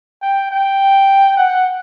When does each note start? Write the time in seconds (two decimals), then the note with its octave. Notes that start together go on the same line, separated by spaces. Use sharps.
0.22 G5
0.51 G5
1.37 F#5